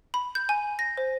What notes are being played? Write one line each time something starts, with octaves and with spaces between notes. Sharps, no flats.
B5
G6
G#5
A#6
C5